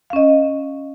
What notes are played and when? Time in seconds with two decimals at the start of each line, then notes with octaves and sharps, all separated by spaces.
0.10 F5
0.13 C#4
0.16 D#5